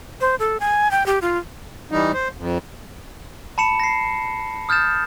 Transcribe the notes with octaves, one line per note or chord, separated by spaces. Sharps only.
C5
A4
G#5
G5
G4
F4
E3 G3 D#4
C5
F2
A5 B5 C#7 E7
A#6 C7
D#6 F6 G6 A6 E7